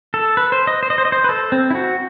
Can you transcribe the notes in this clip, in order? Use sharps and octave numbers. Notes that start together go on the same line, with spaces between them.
A4
B4
C5
D#5
C5
D#5
C5
D#5
C5
B4
A4
C4
E4
F#4